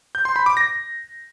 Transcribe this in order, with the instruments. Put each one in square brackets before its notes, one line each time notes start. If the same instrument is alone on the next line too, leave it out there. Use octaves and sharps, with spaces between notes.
[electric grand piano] G6
C6
B5
D6
A#6